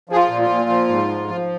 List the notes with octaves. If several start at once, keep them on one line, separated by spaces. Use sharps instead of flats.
F3 G#4
F4
A#2
F4
A#2
F3
G#2
F3
F3